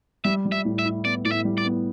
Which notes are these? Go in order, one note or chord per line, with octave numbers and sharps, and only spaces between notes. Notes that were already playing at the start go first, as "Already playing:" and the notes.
G3 E5
G3
E5
A2
E5
E4
B3 D5
A2 D5
E5
G3
D5
B3